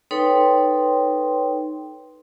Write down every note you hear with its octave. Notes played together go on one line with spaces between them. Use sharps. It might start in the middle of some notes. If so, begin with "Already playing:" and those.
D#4 A4 B4 C#5 G5 C6